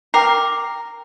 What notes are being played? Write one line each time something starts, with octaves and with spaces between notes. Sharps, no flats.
A#4 G5 D6 C7